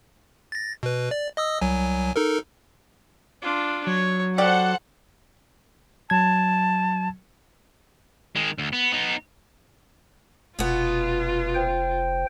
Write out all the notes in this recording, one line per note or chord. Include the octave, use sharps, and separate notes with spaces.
A6 A#6
B2 B4
D5
D#5 D#6 E6
C2 F#3 G#5
D#4 A4 A#4
D4 F4
F#3 C#5
G4 A4 C5 D5 F#5
F#3 A5 G#6
D#3 G#3
D2
B3
B3 D#4
F1 B2 B3 F4
C5 G5